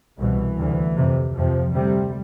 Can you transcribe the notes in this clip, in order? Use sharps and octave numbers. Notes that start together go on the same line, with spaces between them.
C2 B2 E3
D2 C3
F2 C3
F2 C3 F3
D2 C3 G3